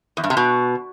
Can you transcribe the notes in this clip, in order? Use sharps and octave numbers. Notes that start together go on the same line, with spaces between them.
E2
G2
C3
B2